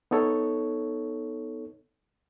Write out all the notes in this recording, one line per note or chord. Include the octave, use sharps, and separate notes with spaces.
B3 D#4 A4 C#5